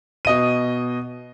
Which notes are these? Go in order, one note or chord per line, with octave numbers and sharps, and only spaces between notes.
B2 D#5 D#7